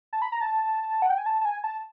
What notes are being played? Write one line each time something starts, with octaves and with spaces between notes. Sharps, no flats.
A5
B5
A#5
A5
F#5
G5
G#5
A5
A5
G#5
A5